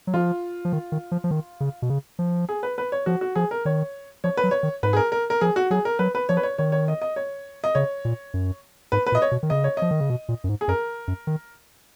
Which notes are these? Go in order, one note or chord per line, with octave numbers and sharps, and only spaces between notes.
F#3
F3 F4
F3
D#3
D#3
F3
F3
D#3
C#3
B2
C#3
F3
G#4
B4
B4
C#5
F3 F#4
F#4
F3 G#4
A#4
D#3 C#5
F3 C#5
B4
F#3
C#5
D#3
G#2 B4
G#4
A#4
A#4
A#4
F3 G#4
F#4
F#3 G#4
A#4
F#3 B4
B4
F3 C#5
B4
C#5
D#3 C#5
C#5
D#5
D#5
C#5
D#5
C#3 C#5
A#2
F#2
G#2 B4
B4
A#2
D#5
C#5
B2
D#3
C#3 D#5
C#5
F3 D#5
D#3
C#3
B2
A#2
F#2
G#2
G#4
F#2 A#4
F#2
D#3